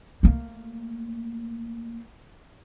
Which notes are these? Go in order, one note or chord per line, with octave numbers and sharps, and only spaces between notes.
A3 A#3